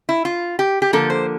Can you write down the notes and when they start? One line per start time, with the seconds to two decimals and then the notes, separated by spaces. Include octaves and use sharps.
0.09 E4
0.25 F4
0.59 G4
0.82 G4
0.93 D3 F3 A#3 A4
1.10 C5